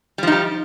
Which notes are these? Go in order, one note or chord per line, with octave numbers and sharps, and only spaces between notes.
F3 G3 D#4 G4